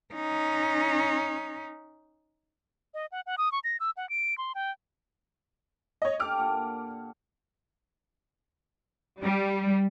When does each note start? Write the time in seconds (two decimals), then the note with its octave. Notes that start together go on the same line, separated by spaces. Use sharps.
0.14 C#4 D#4
2.94 D#5
3.12 F#5
3.26 F#5
3.38 D#6
3.52 C#6
3.64 A#6
3.80 E6
3.97 F#5
4.09 D7
4.38 C6
4.55 G5
6.02 C#5 D#5
6.20 D4 G4 A4 D6 F6
6.37 A#2 F#5
9.21 G3